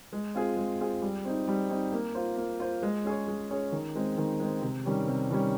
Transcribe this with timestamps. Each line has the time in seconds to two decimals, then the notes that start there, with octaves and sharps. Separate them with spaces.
0.13 G#3
0.35 C4 F4 G#4
0.57 G#3
0.79 C4 F4 G#4
1.02 G3
1.25 C4 D#4
1.48 G3
1.70 C4 D#4
1.93 A#3
2.15 F4 C5
2.37 A#3
2.60 F4 C5
2.82 G#3
3.04 C#4 G#4 C#5
3.28 G#3
3.50 C#4 G#4 C#5
3.72 D#3
3.95 G#3 C4
4.18 D#3
4.40 G#3 C4
4.62 C3
4.85 D#3 G3 C#4
5.08 C3
5.30 D#3 G3 C#4